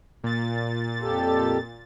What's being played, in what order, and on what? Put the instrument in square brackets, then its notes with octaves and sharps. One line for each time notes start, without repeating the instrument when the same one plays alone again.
[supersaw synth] A#2 A6
[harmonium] F2 G4 A4